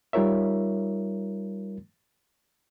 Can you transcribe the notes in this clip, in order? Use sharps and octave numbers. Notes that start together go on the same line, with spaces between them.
G3 D#4 F4 A#4 C#5 E5